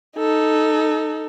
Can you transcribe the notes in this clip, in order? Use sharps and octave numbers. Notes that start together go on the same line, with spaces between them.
D#4 A4